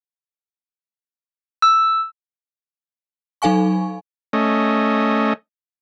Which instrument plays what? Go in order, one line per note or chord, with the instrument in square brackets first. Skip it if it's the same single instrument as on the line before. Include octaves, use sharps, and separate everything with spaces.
[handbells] E6
[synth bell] F#3 D#4 A4 F5 G#5 C#6
[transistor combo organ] A3 C#4 D#5